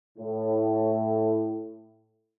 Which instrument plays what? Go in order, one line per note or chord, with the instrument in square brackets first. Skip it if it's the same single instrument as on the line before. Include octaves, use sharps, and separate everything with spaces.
[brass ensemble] A2